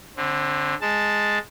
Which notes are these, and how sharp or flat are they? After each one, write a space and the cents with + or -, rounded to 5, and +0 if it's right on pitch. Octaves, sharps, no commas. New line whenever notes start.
D3 +0 C4 +35
G#3 +0 A5 +0